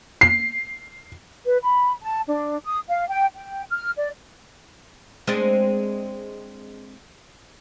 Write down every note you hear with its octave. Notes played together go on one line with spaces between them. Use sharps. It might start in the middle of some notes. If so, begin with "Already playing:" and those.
C7
B4
B5
A5
D4
D#6
F5
G5
G5
F6
D5
G#3 C4 D4